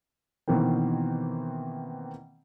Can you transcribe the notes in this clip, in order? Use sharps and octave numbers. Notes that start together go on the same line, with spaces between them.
B2 D#3 E3 A#3 C4